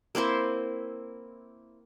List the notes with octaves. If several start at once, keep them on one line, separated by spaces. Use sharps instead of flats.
A#3 C4 E4 C5